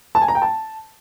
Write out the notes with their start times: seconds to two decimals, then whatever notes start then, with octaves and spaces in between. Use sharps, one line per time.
0.15 A5
0.22 G#5
0.28 A#5
0.35 G5
0.42 A5